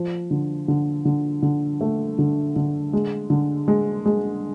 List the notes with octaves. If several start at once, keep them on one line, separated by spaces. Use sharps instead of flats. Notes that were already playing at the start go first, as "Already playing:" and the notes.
Already playing: F3
D3
D3
D3
D3
A3
D3
D3
G#3
D3
G#3
G#3